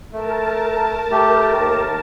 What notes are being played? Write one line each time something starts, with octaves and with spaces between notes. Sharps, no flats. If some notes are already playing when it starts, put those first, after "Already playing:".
A3 A#4 A5
A3 G4
D#2